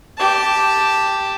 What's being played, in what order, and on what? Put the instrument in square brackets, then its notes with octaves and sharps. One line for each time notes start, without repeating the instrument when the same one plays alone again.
[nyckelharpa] G4 A5